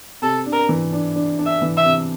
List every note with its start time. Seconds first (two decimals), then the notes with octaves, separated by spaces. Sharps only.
0.22 C3 A4
0.46 D4
0.53 A#4
0.69 E3
0.92 D4
1.15 D4
1.39 D4
1.46 E5
1.62 E3
1.77 E5
1.85 C3